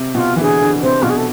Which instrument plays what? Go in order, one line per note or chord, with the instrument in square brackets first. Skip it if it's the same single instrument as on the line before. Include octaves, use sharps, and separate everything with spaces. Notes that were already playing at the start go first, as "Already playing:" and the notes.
Already playing: [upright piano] C3
[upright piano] B2 [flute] F4
[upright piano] E3
[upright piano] D3 [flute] G#4
[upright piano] D3
[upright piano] C3 [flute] C5
[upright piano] B2 [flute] F4
[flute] G#4
A4